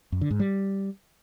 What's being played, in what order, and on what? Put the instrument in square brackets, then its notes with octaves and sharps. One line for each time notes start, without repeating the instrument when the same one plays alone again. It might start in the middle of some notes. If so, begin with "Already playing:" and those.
[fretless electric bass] F#2
D3
G#2
G3